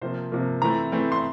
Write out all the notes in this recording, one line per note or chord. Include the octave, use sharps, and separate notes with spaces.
C3 F3 A#3 C5
C3 F3 A#3
E3 A3 C4 A#5
E3 A3 C4
C6